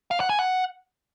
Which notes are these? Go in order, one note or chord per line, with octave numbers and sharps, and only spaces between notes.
F5
F#5
G#5
F#5